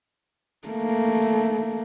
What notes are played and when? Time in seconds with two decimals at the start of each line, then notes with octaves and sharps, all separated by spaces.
0.68 A3 A#3